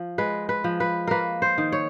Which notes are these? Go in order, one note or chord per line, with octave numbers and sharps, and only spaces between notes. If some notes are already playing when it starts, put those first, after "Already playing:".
Already playing: F3
G#3 B4
B4
F3
B4
A#3 A#4 B4
C5
D#3
C#5